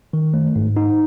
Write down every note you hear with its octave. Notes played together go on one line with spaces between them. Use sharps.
D#3
A3
G#2
D#4